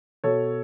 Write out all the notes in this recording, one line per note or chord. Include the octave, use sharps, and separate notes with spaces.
B2 A4 C#5